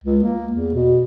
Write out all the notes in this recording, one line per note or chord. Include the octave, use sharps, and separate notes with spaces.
C#2
A#3
E2
B2